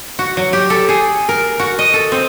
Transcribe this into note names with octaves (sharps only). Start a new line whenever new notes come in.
F#4
F#3
G4
A4
G#4
A#4
F#4
D#5
A4
C4